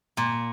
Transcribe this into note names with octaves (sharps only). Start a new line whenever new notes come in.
A#2